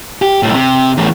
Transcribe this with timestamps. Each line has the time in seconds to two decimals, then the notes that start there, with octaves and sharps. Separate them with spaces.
0.22 G4
0.43 B1 A2
0.55 C3
0.97 E2 A2